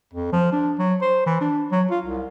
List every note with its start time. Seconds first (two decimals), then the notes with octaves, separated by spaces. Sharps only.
0.14 F2
0.33 F3
0.52 D4
0.79 F#3
1.02 C5
1.26 E3
1.41 D4
1.72 F#3
1.91 F4
2.06 C2